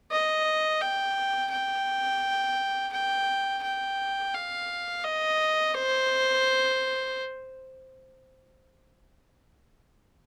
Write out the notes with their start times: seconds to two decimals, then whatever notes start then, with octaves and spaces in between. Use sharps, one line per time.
0.12 D#5
0.82 G5
1.52 G5
2.93 G5
3.63 G5
4.34 F5
5.04 D#5
5.74 C5